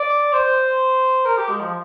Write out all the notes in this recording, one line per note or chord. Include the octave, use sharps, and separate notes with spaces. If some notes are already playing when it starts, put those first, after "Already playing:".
Already playing: D5
C5
A#4
G4
G#3
F3